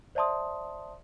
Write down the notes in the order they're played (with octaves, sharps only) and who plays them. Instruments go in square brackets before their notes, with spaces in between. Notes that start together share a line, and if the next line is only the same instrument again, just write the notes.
[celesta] C5 D5 E5 A5 C6 D#6